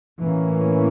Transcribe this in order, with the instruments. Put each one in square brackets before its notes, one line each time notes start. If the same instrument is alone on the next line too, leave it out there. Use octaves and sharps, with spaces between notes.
[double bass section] A2 E3 A#3 C#4